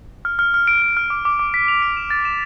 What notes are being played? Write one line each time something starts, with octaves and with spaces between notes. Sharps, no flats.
F6
F6
F6
D7
F6
F6
D6
D6
D6
B6
F7
D7
E7
A6
E7